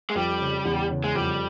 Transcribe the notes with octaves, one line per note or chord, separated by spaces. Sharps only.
G#3
F2 G3
C#3
E2
C#3
G#3
F2 G3